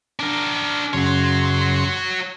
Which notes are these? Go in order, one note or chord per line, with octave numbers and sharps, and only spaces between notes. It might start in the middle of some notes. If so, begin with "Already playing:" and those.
D4 A#4
F#2 C#3 F#4 C#5 C6